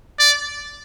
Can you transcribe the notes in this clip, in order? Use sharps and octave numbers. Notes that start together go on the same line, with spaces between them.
D5